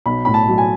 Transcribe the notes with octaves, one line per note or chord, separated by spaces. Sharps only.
B1 B5
A2 B5
A5
F#3
G#5